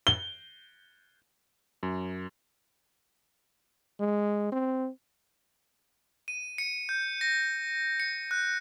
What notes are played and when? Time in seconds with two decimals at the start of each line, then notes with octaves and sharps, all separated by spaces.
0.07 G7
1.83 F#2
4.00 G#3
4.52 C4
6.28 D#7
6.58 C#7
6.89 G6
7.21 A#6
8.00 C#7
8.31 F#6